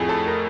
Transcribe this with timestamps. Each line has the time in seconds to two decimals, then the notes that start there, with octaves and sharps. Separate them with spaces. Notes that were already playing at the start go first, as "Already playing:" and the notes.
Already playing: F2 A2 G#4
0.09 A4
0.26 A#4